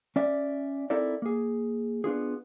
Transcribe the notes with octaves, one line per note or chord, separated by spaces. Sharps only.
C#4 D5 E5
C4 D#4 E4 A4 A#4 D5
A#3 G#4
B3 D4 F4 G#4